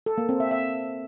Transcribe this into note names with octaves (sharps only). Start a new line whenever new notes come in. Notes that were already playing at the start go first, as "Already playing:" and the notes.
A4
A#3
C4
E5
E5